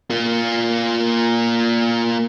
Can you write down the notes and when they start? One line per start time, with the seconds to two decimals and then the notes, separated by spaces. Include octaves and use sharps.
0.10 A#3 F4